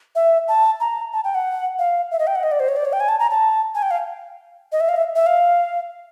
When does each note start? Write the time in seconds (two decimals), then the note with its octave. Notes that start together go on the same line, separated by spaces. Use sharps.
0.15 E5
0.48 A5
0.80 A#5
1.13 A5
1.24 G5
1.35 F#5
1.79 F5
2.11 E5
2.19 D#5
2.27 G5
2.35 F#5
2.43 D#5
2.52 D5
2.60 C5
2.68 C#5
2.76 D5
2.85 C#5
2.93 G5
3.00 G#5
3.09 A5
3.19 A#5
3.31 A5
3.75 G#5
3.82 G5
3.91 F5
4.72 D#5
4.80 E5
4.89 F5
4.96 E5
5.16 E5
5.26 F5